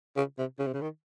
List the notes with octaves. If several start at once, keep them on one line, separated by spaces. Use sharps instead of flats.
C#3
C3
C#3
C3
C#3
D#3